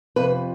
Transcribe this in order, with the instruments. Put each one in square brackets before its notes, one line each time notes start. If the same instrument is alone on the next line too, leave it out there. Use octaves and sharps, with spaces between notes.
[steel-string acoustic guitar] F2 C3 F3 B4